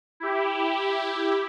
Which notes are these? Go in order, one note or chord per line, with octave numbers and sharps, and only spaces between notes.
E4 G4